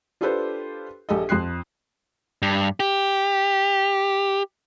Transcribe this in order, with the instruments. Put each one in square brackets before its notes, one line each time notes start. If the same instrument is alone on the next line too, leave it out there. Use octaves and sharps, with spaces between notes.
[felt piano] D4 F4 G4 A4 B4 C5
A#1 G4 A4 D#5
F2 C6 F#6 C7
[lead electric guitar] G2
G4